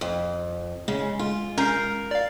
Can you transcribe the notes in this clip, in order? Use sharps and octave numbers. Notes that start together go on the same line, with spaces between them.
F2
C#3 G#3
F4
C#4 A#4 G6 C7
D5 F5